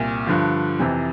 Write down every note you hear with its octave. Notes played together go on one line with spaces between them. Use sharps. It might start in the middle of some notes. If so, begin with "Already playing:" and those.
Already playing: C2 A#2
G2 D3 F3
F2 C3 E3